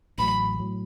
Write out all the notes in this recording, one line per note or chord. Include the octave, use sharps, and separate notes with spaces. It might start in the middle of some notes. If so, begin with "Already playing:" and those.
A1 A2 F#3 B5
A2 F#3